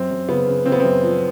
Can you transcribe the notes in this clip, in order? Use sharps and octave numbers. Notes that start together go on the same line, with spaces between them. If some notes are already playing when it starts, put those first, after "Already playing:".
Already playing: F#2 C4
F#2
C#3 B3
C#3
C#3 C4
B3
F#2 C4
F3